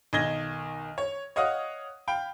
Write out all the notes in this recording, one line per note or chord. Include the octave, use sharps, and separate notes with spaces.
B1 D#3 D#5 G#6 A#6 G7
C#5
C#5 D#5 F5 F#5 D#6
F5 G5 B5